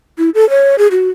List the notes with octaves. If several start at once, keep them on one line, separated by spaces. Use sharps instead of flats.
E4
A4
C#5
G#4
F#4